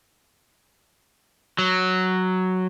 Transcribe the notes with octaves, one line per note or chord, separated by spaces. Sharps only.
F#3